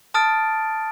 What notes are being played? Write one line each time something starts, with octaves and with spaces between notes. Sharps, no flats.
A5 D#6 F6 A6 D7